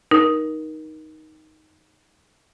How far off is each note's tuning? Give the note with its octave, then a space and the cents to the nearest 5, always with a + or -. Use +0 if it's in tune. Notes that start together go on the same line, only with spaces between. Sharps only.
D#4 +5 A#4 +20